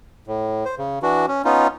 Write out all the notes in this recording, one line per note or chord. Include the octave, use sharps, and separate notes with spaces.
A2
C5
C#3
E3 D4 F#4
C#4
B3 C#4 D#4 F4